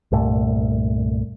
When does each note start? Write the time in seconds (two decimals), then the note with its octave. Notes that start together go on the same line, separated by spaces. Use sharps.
0.12 C2 G2 A#2 A3